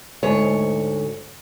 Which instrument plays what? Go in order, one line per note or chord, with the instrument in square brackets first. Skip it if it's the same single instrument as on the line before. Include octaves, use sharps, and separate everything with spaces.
[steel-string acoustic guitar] D2 G#2 C#5